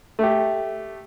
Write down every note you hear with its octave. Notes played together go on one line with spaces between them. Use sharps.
A3 G4